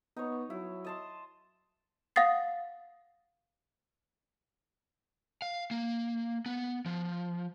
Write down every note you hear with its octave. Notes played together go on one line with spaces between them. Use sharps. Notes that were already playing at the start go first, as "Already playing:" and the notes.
B3 D#4 C#5
F#3 E4
D#5 A5 C6
F5 F#5 D#6 A6 C7
F5
A#3
B3
F3